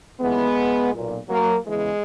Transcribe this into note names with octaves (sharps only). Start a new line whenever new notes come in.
D#2 C#3 E3 G#3 B3
B1 A#2
F#3 A#3
E2 C#3 E3 G#3